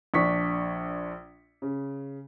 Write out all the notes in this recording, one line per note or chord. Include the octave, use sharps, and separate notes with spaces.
A#1 D4 C#6 B6
C#3